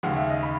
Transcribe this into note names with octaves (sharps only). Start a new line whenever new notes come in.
D#2 C#3 G#3 F#5
E5
D#5
B5